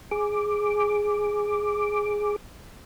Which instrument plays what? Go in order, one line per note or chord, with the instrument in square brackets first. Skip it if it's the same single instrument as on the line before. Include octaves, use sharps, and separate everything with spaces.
[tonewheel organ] G#4 D6